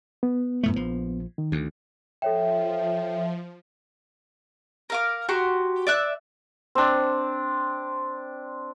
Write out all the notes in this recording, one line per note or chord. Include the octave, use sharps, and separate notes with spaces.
B3
F#2 A2 A3
A#1 F3
D#3
D2
F3 A4 C#5 E5 G5
A#4 F5 D6
F#4 G4 A#5 C6
D5 E5 F#6
C4 D4